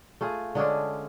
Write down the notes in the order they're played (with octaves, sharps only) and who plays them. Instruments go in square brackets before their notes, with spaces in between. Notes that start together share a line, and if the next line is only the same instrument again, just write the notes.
[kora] A3 F4 G#4
D3 G#3 C#4 D4